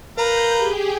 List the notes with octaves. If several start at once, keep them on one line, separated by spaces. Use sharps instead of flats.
A#4 B4 F5 A#5 G6
G4 G#4